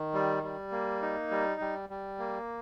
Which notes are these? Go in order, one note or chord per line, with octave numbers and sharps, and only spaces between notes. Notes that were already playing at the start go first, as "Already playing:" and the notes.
Already playing: D#3
G3
G3
A#3
D#4
G3
G3
G3
A#3